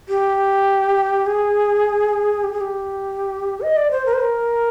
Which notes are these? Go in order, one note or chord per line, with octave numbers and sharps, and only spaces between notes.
G4
G#4
G4
G#4
G4
D#5
D5
C5
A#4
C5
A#4